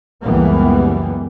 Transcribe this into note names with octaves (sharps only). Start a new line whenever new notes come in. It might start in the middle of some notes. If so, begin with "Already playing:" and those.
C#2 F#2 E3 G3 A#3 B3